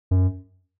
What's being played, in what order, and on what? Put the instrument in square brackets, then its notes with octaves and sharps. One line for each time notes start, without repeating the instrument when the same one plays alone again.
[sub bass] F#2